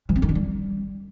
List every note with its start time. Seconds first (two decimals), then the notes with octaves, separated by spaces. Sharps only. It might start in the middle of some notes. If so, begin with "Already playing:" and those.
0.09 E3
0.16 C4
0.22 D#3
0.29 D4
0.35 G3